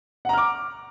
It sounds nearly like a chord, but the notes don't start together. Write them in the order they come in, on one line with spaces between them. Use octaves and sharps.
F#5 A#5 F6 D6